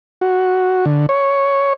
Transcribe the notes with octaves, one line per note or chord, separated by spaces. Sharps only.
F#4
D3
C#5